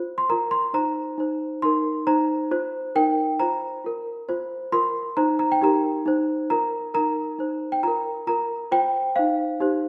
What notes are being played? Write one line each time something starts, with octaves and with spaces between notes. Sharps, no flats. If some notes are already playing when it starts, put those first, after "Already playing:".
Already playing: F4 C5
C6
F4 A#4 A#5
C6
D#4 C5 A#5
D#4 C5
D#4 A#4 C6
D#4 C5 A#5
F4 C5
D#4 A#4 G5
F4 C5 A#5
F4 A#4
F4 C5
F4 A#4 C6
D#4 C5 A#5
A#5
G5
D#4 G4 A#4 A#5
D#4 C5
F4 A#4 A#5
D#4 A#4 A#5
D#4 C5
G5
F4 A#4 A#5
F4 A#4 A#5
F4 C5 G5
D#4 C5 F5
D#4 G4 C5